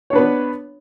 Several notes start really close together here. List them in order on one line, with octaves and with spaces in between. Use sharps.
C#5 D4 B4 B3